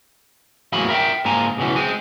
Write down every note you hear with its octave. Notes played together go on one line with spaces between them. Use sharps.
E2 A2 F#3 A#3 G#4 B5
A#4 E5 G5
G#2 D3 A#3 G#5 A#5
C#2 B2 D#3 E3 C#4
G#3 C4 G#4